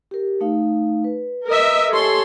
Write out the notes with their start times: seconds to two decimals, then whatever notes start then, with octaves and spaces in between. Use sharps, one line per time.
0.11 G4 A#4
0.41 A3 D#4 F5
1.04 B4
1.48 A#4 D#5 E5
1.92 G4 A4 C#5 G#5 C6